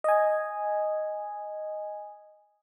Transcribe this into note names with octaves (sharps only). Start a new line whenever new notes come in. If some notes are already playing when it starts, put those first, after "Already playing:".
D#5 G#5